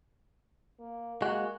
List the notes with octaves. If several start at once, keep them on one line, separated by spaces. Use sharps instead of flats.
A#3
G#3 A#3 F#4